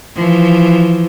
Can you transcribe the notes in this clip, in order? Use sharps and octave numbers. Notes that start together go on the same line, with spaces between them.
E3 F3